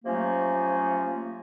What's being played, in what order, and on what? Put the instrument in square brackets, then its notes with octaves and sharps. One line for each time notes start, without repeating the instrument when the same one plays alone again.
[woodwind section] C3 F3 F#3 A3 A#3 C#4